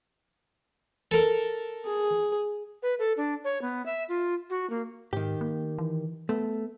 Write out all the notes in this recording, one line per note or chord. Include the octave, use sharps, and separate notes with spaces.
A4 A#4
G#4
B4
A4
D4
C#5
B3
E5
F4
F#4
A#3
G#2 D#3 G4
A#3
E3
A3 B3